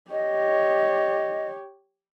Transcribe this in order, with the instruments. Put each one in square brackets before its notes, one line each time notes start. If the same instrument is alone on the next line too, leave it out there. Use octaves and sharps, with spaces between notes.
[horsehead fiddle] G4 C#5 [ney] D#5